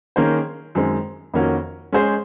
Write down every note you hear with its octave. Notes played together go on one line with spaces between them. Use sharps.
D#3 A#3 C#4 G#4 C5
F#2 D#3 G#3 C4
F2 D#3 A#3 C#4 F#4
G#3 C#4 G#4 C5